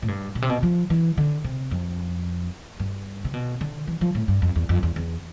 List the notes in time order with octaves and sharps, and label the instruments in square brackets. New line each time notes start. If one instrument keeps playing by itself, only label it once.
[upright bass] A2
G2
B2
C3
B2
F3
E3
D3
C3
F2
G2
C3
B2
D3
E3
F3
A2
G2
F2
E2
F2
E2
E2